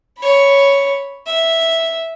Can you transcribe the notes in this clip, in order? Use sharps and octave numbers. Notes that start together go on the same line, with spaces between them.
C#5 B5
E5